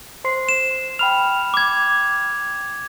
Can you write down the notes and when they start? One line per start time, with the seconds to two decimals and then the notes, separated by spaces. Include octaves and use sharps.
0.24 C5 C6 C7
0.49 E7
0.99 G5 B5 F6 F7
1.54 D6 G#6